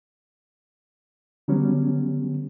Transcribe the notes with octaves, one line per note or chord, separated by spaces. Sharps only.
D3 F#3 G3 B3 C#4